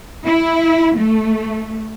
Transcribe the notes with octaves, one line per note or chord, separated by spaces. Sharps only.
E4
A3